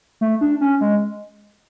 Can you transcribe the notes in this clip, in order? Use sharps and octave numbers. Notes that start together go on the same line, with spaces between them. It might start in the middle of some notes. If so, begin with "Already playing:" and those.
A3
D4
C#4
G#3